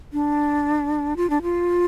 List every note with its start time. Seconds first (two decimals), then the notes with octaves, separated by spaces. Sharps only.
0.13 D4
1.17 F4
1.30 D4
1.42 F4